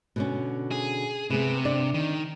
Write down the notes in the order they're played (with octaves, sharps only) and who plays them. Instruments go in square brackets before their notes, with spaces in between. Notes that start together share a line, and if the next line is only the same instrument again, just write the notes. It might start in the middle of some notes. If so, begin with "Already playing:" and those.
[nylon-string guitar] B2 D3 C#4
[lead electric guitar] G#4
[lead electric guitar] C3 [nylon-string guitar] B3 G#4 B4
[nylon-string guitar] D4 D5
[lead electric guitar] D#3